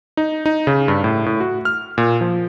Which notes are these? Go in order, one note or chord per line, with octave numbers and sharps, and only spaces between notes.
D#4
D#4
C#3
G2
A2
A2
F#4
F6
A#2
F3